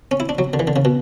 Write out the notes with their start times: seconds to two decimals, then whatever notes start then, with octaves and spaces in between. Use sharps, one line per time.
0.11 C#4
0.20 E4
0.29 D4
0.39 F#3
0.53 D3
0.59 E3
0.67 D3
0.76 C#3
0.85 B2